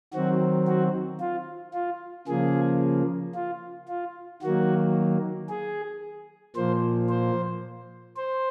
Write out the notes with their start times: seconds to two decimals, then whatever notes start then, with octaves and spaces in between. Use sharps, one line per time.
0.13 D#3 F#3 C4 F#4
0.67 F#4
1.20 F4
1.74 F4
2.28 C#3 F3 A#3 G#4
3.35 F4
3.88 F4
4.42 D#3 F#3 A#3 F#4
5.49 G#4
6.56 A#2 F3 A#3 C5
7.09 C5
8.17 C5